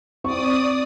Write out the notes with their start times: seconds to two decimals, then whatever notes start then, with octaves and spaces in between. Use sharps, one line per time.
0.24 C4 D5 C#6 D#6